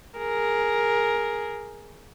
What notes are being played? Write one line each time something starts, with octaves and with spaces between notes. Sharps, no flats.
G#4 A#4